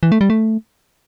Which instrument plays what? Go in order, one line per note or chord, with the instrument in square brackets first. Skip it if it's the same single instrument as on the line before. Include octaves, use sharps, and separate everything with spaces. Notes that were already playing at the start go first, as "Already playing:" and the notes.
[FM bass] E3
A3
G3
A3